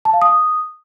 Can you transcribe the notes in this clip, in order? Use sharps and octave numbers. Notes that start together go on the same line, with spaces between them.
A5
F5
D#6